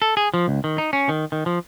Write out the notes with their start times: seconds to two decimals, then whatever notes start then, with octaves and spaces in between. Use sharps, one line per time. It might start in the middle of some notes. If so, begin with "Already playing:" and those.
0.02 A4
0.17 G#4
0.34 F3
0.48 C#2
0.64 D#3
0.78 D#4
0.93 C#4
1.09 D#3
1.32 D#3
1.46 F3